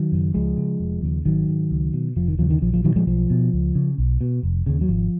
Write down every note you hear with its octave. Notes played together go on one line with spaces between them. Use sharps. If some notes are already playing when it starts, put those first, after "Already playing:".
Already playing: D#3 F#3
F#2 C#3
C#2 F3 G#3
C#3
F1
D#2 C#3
G#1 D#3 F#3
G#2
C#2
B2
F1 F3
D#3
D#2 C#3 F3
D#3
A#1 F3
F3
A#2 D#3 F#3
F3 G#3
B1 F3
B2
C#2
C#3
B1
B2
F1
D#2 C#3
F#3
G#1 F3